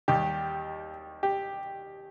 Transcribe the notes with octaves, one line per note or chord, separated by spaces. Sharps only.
D#2 D#3 G3 G4
G4